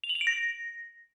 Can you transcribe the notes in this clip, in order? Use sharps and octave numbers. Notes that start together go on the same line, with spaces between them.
F7
F#7
F7
D7
A#6